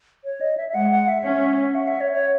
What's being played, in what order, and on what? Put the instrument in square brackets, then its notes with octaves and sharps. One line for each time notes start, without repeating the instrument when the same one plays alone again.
[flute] C#5
D#5
E5
E5
[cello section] G#3 [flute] F#5
[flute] F#5
E5
[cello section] C#4
[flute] F#5
E5
C#5
C#5